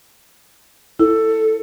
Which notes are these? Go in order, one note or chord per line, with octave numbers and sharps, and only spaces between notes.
E4 A4